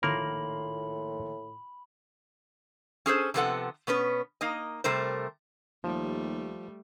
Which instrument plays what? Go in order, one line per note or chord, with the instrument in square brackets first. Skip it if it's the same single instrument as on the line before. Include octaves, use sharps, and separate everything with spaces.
[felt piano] A#1 D#3 C6 [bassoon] A2 [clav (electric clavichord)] A#3 A#4 [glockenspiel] B5 F#7
[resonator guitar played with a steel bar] C#4 G#4 A4 C5
C3 F3 G#3 B3 A4 F#5
B2 B3 C#4 B4
A#3 D#4 D#5
C3 G3 A3 A#4 C5
[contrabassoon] D#2 [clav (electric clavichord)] F3 [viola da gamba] G3 A3